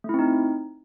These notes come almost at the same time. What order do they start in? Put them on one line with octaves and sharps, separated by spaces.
A3 E4 C4 D#4